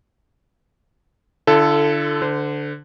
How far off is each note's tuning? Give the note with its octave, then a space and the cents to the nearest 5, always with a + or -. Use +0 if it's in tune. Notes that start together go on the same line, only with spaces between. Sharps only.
D3 +10 F4 -45 A4 +0
D3 +0 C5 -35